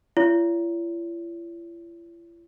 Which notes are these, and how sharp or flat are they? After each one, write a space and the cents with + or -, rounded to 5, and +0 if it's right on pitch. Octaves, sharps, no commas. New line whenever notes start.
E4 +45 C#5 +40